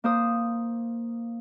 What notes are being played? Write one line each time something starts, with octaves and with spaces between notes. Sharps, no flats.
A#3 C5 D#6